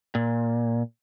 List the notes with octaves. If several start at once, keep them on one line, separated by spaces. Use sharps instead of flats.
A#2